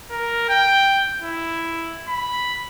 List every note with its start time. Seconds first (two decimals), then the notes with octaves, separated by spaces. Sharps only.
0.11 A#4
0.49 G5
1.22 E4
2.09 B5